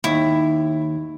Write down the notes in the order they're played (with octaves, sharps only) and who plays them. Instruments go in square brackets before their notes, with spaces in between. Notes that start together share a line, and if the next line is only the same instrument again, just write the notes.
[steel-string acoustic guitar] D#2 [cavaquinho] E4